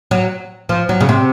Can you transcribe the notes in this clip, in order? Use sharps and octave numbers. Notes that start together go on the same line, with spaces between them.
F#3
F3
F#3
C#3
C3